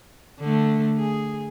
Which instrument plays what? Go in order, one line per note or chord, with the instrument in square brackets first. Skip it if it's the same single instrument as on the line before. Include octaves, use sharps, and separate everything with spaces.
[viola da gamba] D3 A3
G#4